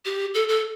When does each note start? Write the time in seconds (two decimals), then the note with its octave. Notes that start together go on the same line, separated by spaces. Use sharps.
0.05 G4
0.34 A4
0.49 A4